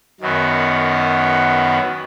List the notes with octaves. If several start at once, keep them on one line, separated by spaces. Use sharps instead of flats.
F#2 D#3 F#3 B3